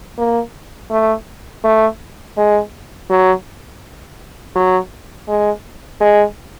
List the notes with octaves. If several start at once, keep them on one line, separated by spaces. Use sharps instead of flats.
A#3
A3
A3
G#3
F#3
F#3
G#3
G#3